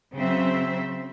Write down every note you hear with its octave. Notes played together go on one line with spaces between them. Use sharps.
C#3 F#3 C4 C5 E5